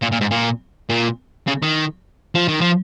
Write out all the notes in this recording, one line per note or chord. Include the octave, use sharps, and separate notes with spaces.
A#2
A#2
G#2
A#2
A#2
C#3
D#3
F3
D#3
F3